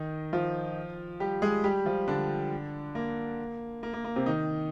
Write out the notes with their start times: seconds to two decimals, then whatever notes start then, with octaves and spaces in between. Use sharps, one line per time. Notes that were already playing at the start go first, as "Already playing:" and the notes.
Already playing: D#3 D#4
0.33 F3 F4
1.20 G3 G4
1.42 G#3 G#4
1.64 G3 G4
1.85 F3 F4
2.08 D3 D4
2.95 A#3
3.83 A#3
3.93 A#3
4.05 A#3
4.16 C3 C4
4.26 D#3 D#4